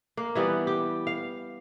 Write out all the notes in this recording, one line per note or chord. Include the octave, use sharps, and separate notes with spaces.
A#3
E3 G3 B3
G4
F5